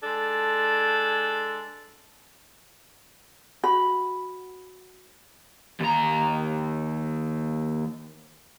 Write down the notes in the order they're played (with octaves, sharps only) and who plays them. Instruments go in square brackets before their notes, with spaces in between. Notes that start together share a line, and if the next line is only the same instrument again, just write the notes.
[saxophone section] G#3 D4 A4
[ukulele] F#4 B5
[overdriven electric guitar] D#2 A#5